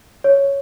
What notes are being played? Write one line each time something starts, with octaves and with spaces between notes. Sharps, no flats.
C#5